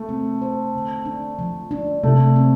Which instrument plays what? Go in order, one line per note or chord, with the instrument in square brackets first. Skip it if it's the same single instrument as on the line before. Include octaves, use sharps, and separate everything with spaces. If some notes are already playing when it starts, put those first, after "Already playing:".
Already playing: [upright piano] A3 [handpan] A4
[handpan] C4
C5
D3
D4
F3
D4
[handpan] C3 [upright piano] A3
[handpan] C4